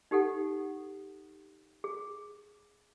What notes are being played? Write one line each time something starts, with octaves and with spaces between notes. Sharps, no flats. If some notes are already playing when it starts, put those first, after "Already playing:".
D#4 G4 A4 F#5
G#4